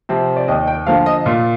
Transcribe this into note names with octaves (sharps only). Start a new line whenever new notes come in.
C3 F3 C4
D5
D#2 D#5
G5
D3 F3 A#3 F5
D#5
A#2 F4